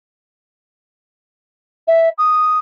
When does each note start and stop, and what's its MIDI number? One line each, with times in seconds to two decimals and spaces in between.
1.87 2.09 76
2.18 2.59 87